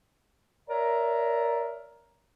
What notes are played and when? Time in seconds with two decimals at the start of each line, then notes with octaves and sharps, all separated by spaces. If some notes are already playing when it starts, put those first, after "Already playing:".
0.69 A#4 C#5 D5 E5 A#5